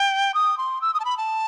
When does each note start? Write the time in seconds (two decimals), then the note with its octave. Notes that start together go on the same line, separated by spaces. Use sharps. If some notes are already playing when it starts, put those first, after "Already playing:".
Already playing: G5
0.34 D#6
0.58 C6
0.81 E6
0.94 D#6
1.00 A5
1.05 B5
1.17 A5